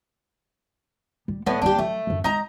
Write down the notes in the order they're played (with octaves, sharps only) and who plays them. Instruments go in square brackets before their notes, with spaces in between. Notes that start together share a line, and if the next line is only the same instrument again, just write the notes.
[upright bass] G3
[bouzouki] A2 D3 B3 [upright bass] G3
[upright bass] G3 A#3 [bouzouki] D4 G4
[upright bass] F#3 [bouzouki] A3
[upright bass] F#2 F3
[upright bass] G#3 [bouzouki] D#4 A#5